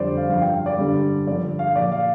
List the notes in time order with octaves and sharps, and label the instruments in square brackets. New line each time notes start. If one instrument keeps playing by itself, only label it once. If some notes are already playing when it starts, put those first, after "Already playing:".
Already playing: [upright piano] F2 D3 G3 C5 D5
F5
G2 F3 F5
G5
F5
D5
G2 D3 G3
G2 D3 F3 D5
F5
A#2 F3 D5
F5